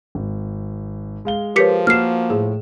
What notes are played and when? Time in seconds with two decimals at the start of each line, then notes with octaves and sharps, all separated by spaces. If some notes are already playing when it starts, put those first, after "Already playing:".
0.15 G#1
1.25 G#3 F5 G7
1.56 F3 G4 A#4 B4 C#5 B6 C#7
1.87 A#3 F#4 F6 C7 E7
2.30 A2 G#4